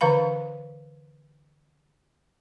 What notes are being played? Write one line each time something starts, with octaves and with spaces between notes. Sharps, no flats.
D3 E3 B4 F5 B5